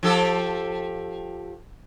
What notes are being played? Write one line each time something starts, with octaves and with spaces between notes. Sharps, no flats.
F3 G4 A4